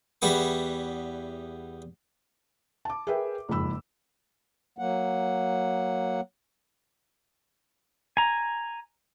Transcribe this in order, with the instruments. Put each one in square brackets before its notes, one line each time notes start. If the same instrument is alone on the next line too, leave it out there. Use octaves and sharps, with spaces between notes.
[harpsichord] E2 G3 B3 C#6
[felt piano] A5 D6
G#4 A#4 B4 E5 G5
F#1 F2 G#2 B5 E6
[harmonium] F#3 A#3 F#5
[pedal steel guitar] G#5 A#5